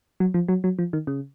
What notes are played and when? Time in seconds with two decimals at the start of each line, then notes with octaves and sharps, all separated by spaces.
0.20 F#3
0.34 F3
0.48 F#3
0.64 F#3
0.79 F3
0.93 D#3
1.07 C#3